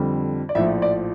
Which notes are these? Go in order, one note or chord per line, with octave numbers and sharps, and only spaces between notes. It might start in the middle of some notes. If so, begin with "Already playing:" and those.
Already playing: F2 D3 G3
D5
A#1 A2 F3 E5
D5